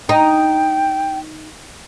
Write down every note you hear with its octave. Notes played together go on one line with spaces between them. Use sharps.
D#4 G5